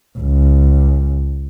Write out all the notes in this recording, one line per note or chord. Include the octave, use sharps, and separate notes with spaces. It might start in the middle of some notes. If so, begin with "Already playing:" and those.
C#2